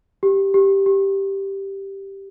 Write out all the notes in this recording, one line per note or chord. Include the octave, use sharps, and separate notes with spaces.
G4
G4
G4